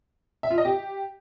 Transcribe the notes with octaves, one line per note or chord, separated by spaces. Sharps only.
E5
F4
D#5
G4